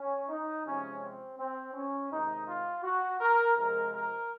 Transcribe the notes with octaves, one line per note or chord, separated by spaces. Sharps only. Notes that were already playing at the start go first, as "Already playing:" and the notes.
Already playing: C#4
D#4
C3 F3 G#3 C#4
C4
C4
C#4
C3 D#3 G#3 D#4
F4
F#4
A#4
C3 F3 G#3 A#4
A#4